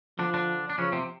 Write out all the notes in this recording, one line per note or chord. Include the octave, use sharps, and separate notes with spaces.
D3 F3 D4
D3 D4
D4
C#3 F3 C#4
C3 C4